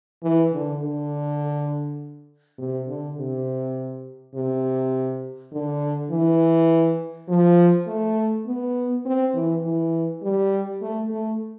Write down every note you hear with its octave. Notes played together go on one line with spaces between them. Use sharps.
E3
D3
D3
C3
D3
C3
C3
D3
E3
F3
A3
B3
C4
E3
E3
G3
A3
A3